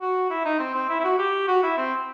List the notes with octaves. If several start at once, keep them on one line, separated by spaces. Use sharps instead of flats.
F#4
E4
D#4
C4
C4
E4
E4
F#4
G4
F#4
E4
C4